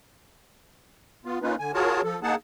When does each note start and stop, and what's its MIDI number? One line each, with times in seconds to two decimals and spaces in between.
1.25 1.39 59
1.25 1.39 65
1.42 1.55 58
1.42 1.55 61
1.42 1.55 63
1.42 1.55 65
1.42 1.55 71
1.59 1.72 50
1.59 1.72 80
1.74 2.01 65
1.74 2.01 66
1.74 2.01 68
1.74 2.01 70
1.74 2.01 73
1.74 2.01 81
2.04 2.19 53
2.04 2.19 69
2.23 2.35 58
2.23 2.35 63
2.23 2.35 68
2.23 2.35 78
2.23 2.35 81